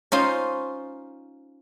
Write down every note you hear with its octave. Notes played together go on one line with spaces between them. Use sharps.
C#4 D#4 F4 C5